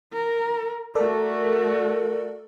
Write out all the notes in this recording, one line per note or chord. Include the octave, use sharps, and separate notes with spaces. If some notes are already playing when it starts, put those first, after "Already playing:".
A#4
A3 F#4 A4 A#4 D5